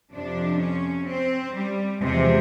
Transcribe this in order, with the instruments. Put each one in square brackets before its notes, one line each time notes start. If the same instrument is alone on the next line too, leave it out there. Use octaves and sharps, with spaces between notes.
[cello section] F2 C3 F3 D4
C#4
C4
G3
E2 C3 F3 G#3